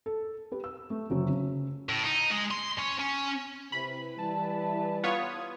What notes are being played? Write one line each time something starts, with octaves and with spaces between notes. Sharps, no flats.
A4
G4 B4
E6
A3
F#1 D3 F#3 C#4 D4
C#3
A2
D#4
G#3
C6
C#4
C#4
C3 E4 B4 B5
E3 G3 A5
B3 F4 C#5 D#6